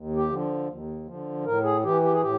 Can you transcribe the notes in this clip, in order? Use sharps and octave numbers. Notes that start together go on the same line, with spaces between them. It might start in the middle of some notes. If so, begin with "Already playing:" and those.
Already playing: D#2
G4
D3 F3
D#2
D3 F3
A2 A#4
G#4
E3 G4
G4
G#4
A2 G4